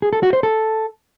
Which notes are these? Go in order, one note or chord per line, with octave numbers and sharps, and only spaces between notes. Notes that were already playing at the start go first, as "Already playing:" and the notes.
G#4
A4
F#4
C5
A4